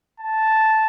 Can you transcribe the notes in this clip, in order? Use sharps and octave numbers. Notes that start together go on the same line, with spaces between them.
A5